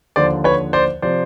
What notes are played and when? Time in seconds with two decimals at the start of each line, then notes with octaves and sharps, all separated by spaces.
0.16 D#2 D3 F3 C5 D5
0.44 B4 C#5
0.73 C5 D5
1.02 C3 F3 C5 D5